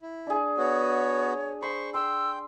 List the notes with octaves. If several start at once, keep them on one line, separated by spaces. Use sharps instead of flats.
E4
D4 G#4
B3 F#4 C#5
C5 B5 C#6
G5 C6 E6